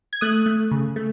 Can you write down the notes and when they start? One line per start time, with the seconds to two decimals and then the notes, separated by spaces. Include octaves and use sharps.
0.13 G#6
0.21 A3 D#6 F#6
0.46 A3
0.71 C#3
0.96 A3